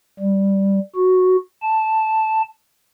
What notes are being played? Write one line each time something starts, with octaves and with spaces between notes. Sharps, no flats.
G3
F#4
A5